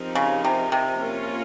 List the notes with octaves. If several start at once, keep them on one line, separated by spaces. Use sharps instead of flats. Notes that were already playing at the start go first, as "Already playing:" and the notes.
Already playing: F3 C4 D#4 G4 A#4
C#3
C3
C3
A#3 C#4 F4 A#4